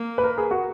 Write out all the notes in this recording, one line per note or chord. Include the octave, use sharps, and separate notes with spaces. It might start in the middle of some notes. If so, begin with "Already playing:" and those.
Already playing: A#3
B4
A#4
G#4
F#4